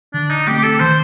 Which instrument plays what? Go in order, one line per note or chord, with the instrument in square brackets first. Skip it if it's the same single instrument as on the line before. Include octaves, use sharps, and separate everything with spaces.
[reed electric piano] D3 [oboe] D4
[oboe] D#4
[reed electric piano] A3 [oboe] G4
[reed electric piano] C4
[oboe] G4
A4
[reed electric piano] D#3 [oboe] C5